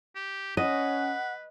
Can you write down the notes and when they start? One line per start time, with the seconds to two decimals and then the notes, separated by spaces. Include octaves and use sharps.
0.16 G4
0.57 C#4 B4 D#5 F#5